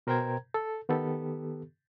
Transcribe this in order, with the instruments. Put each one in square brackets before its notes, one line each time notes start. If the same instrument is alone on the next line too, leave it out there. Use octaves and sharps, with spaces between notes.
[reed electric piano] B2 A#4 C5 G5 A#5 G#6
A4
D#3 B3 G4 A4